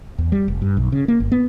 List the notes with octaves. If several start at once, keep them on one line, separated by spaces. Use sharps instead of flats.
E2
G3
F1
G2
B1
C#3
A#3
G1
B3